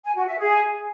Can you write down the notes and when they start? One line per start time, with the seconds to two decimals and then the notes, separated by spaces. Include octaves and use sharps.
0.04 G#5
0.16 F#4
0.27 E5
0.39 G#4